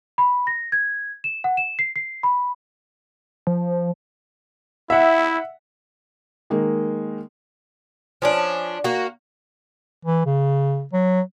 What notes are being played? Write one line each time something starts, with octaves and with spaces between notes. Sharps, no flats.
B5
A#6
G#6
E7
F#5
E7
C7
C7
B5
F3
E4 E5 F#5
D#3 G#3 A#3
F3 C#4 D4
A#3 F#4
E3
C#3
F#3